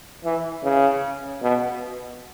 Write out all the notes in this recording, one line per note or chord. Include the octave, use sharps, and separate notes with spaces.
E3
C#3
B2